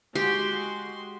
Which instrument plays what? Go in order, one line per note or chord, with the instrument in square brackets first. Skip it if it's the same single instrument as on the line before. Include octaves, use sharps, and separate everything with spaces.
[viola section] G#3 F#4 C6 [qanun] G4